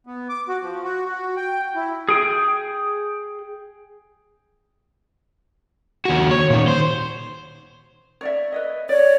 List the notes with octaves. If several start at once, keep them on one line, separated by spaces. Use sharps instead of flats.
B3
D6
F#4
F3
F#4
F#4
G5
E4
G#4 G5
D#2 F#4
C#5
A#2 D#3
C5
C#5 D5 E5
B4 C#5 D#5
C#5 D5